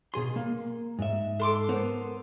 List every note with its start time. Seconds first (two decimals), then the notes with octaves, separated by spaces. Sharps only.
0.14 B2 G#4 C6
0.36 A#3
0.99 G#2 E5
1.40 A4 C6 D6
1.69 B3 A#4 C5